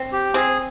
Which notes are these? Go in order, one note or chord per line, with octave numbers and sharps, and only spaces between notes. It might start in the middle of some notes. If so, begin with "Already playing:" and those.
Already playing: C4
G4
C4 G#4